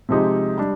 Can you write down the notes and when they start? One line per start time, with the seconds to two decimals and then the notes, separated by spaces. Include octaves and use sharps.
0.09 C3 F3 G#3 D#4 G4
0.57 G3 D4